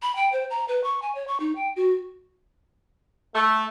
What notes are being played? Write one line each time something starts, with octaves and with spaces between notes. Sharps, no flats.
B5
G5
C5
A#5
B4
C#6
G#5
C#5
C#6
D#4
G5
F#4
A3